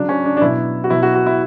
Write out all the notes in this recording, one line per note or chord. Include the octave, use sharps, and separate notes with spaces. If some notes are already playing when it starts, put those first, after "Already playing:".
Already playing: C#3 F#3 D4
C#4
D4
D4
B2 F#3 E4
F#4
B2 F#3 E4
F#4
F#4
E4